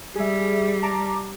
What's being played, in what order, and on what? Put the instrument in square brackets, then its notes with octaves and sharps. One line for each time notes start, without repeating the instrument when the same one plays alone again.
[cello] G3 [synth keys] G#4 E5
[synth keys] A5 A#5 D6